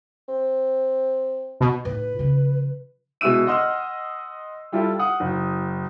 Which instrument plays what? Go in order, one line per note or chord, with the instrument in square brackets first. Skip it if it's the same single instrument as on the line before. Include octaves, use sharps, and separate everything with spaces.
[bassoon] C4
[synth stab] B2
[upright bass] A2 D#4 [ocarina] B4
[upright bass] C#3 F3
[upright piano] B2 G#3 E4 E6 D#7
D#5 F#5 C6 E6 F6
G3 E4 F4 G4 A4
F5 F#5 D#6
F#1